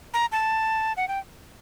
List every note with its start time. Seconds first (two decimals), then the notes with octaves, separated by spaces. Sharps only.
0.14 A#5
0.32 A5
0.97 F#5
1.08 G5